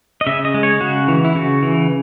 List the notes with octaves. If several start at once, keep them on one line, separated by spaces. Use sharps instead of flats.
D#5
C#3 E5
D#5
G#3
C#5
C#3 F#4
E3
E4
C#3 F#4
E3